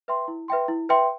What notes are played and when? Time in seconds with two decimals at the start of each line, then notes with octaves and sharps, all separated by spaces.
0.08 B4 E5 G5 C6
0.28 E4
0.48 B4 E5 G5 C6
0.68 E4
0.89 B4 E5 G5 C6